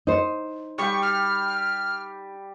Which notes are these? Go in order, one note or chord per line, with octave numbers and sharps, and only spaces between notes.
D#4 C5
G3 G5 C#6
F6